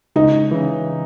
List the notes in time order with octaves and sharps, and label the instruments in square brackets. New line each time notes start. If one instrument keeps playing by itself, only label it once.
[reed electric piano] C#2 [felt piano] D#4
[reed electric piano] C#3 E3